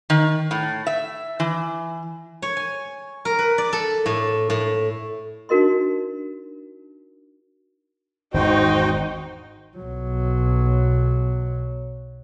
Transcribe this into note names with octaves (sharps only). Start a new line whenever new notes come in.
D#3
A2
E5
E3
C#5
G#5
A#4
B4
D5
A4
A2
A2
D4 D#4 F#4 A#4 D#5 C6
G#1 E2 D#4 F#4 C5 G5
B1 F#3